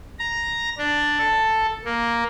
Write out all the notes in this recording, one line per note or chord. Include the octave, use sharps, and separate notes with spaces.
A#5
D4
A4
A#3